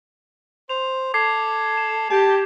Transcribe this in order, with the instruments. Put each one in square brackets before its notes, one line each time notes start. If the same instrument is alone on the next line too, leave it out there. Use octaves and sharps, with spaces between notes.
[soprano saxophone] C5 [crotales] F7
[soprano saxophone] A4 [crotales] D6 G#6 C7
[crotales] E7
[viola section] G4 [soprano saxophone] A5